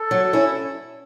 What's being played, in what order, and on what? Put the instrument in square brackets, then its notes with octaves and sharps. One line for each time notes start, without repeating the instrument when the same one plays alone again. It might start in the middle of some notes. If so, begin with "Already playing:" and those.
Already playing: [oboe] A4
[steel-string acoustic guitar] F#3
C#4 E4